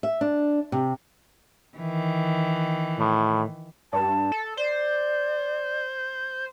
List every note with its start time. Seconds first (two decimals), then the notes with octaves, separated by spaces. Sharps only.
0.03 E5
0.21 D4
0.72 C3
1.78 D#3 E3
2.99 A2
3.93 G2 A5
4.32 A4
4.57 C5 D5